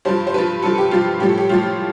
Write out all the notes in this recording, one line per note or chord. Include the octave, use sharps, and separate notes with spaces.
G2 F3 C5
C5
G2 F3 B4
G2 F3 A4
G4
G2 F3 F4
A2 F3 G4
A4
G4
A2 F3 F4